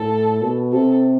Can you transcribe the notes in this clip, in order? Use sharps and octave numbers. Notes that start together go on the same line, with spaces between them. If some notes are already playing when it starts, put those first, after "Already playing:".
Already playing: A2 A4
B2
C3 A4